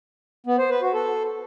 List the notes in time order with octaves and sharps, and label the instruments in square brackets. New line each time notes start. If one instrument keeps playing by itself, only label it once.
[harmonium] B3
C5
B4
F#4
A4